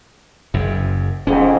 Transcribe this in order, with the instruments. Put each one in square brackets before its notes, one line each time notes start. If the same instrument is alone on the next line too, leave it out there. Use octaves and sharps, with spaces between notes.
[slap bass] F#1 F#2
[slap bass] E1 C#4 [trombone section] F2 G#2